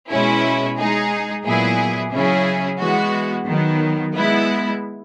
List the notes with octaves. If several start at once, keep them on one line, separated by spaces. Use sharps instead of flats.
B2 G#3 C#4 E4
G#3 D#4 G#4
A#2 F#3 B3 E4 G#4
C#3 F#3 C#4 E4 G#4
E3 G#3 B3 F#4
D#3 F#3 B3
G#3 B3 E4